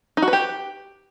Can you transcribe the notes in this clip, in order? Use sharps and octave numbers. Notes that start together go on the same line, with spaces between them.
D#4
F#4
B4
G4